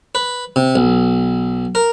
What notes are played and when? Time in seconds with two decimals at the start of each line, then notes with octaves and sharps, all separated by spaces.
0.15 B4
0.56 C3
0.76 B1
1.75 A#4